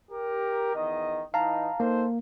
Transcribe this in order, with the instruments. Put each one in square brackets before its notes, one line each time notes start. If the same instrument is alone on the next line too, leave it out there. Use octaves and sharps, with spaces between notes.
[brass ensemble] G4 A#4
E2 D#3 D#5
[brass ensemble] E3 D#4 [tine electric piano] F5 A5 A#5
[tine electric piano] A#3 [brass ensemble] D#4 A4 C5